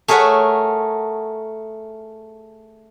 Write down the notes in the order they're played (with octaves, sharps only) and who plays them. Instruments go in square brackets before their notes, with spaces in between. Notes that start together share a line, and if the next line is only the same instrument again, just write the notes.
[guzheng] A3 G#4 A#4 C#5 E5 F#5